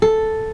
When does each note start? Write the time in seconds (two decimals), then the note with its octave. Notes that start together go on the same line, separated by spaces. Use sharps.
0.02 A4